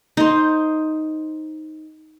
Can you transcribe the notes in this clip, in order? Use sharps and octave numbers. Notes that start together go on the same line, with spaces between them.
D#4 C5